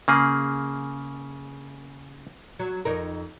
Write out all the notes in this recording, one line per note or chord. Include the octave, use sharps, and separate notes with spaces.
C#3 A#3 G#4
F#3
F2 D#4 A#4